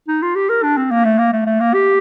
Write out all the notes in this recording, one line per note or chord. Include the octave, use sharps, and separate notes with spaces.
D#4
F4
G4
A#4
D4
C4
A#3
A3
A#3
A3
A3
A#3
G4